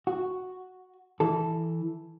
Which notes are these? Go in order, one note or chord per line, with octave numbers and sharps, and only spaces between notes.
F#4
E3 A4